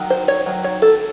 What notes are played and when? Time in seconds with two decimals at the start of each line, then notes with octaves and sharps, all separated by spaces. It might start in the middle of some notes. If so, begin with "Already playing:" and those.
Already playing: D#3 F#3
0.10 C5
0.28 C#5
0.46 D#3 F#3
0.64 C#5
0.82 A4